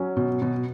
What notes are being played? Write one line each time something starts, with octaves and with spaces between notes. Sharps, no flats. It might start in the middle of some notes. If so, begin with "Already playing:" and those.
Already playing: F#3 C#4
B2
B2